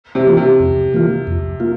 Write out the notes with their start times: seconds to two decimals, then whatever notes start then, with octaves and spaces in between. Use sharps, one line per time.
0.15 C3
0.27 E3 A#3 F4
0.37 C3
0.60 F2
0.94 E3 A#3 F4
1.27 F2
1.60 A#3 F4